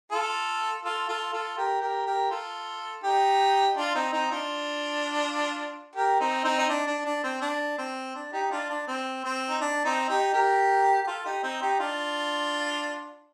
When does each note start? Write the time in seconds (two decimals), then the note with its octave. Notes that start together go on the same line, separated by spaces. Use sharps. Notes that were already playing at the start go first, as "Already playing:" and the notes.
0.11 F4 A4
0.84 F4 A4
1.09 F4 A4
1.33 F4 A4
1.57 G4 A#4
1.82 G4 A#4
2.06 G4 A#4
2.31 F4 A4
3.03 D#4 G4
3.77 D4 F4
3.95 C4 D#4
4.13 C4 D#4
4.31 D4 F4
5.95 G4 A#4
6.20 C4 D#4
6.44 C4 D#4
6.59 D#4
6.69 D4
6.87 D4
7.05 D4
7.24 C4
7.41 D4
7.78 C4
8.15 D4
8.33 D#4 G4
8.51 D4 F4
8.70 D4
8.88 C4
9.24 C4
9.50 D#4
9.61 D4
9.85 C4 D#4
10.09 D#4 G4
10.34 G4 A#4
11.03 G4
11.07 F4 A4
11.25 D#4 G4
11.43 C4 D#4
11.62 D#4 G4
11.80 D4 F4